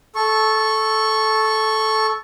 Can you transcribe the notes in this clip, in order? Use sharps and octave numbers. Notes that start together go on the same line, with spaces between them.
A4 C#6